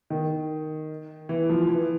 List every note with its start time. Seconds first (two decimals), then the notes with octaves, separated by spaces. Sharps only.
0.10 D#3
1.29 E3
1.49 F3
1.69 E3